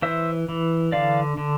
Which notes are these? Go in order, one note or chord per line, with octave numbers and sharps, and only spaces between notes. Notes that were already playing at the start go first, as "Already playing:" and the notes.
E3 C5 E5
E3
D3 D5 F5
D3